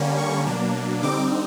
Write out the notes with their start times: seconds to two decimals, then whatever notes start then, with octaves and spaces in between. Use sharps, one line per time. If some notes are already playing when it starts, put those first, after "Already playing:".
Already playing: D3 G3 A#3 C#4
0.18 C#6
0.46 B2 F#3 A#3 D4
1.02 D3 G3 C4 D#4 D6